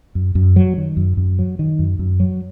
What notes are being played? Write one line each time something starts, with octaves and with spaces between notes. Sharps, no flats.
F#2
F#2
F#3
D#3
F#2
F#2
F#3
D#3
F#2
F#2
F#3